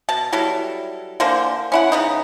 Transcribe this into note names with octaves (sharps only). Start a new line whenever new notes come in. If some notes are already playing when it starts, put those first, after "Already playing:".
B2 A5
F#3 G3 E4 A4
D3 E3 A#3 C5
C#4 E4 F#5
C#3 B3 D#4